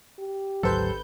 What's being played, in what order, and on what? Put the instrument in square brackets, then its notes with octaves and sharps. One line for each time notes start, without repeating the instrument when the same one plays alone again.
[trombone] G4
[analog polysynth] G#1 B4 G6 [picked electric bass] D2 G#2 F#3 [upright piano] A4 C5